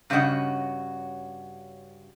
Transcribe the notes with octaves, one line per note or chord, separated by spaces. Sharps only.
G2 C#3 C#4 F#4 D#5 F#5